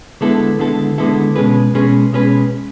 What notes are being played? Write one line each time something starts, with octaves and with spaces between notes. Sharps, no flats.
D3 G#3 B3 E4 A4
D3 G#3 B3 E4 A4
D3 G#3 B3 E4 A4
B2 G#3 C#4 G#4 B4
B2 G#3 C#4 G#4 B4
B2 G#3 C#4 G#4 B4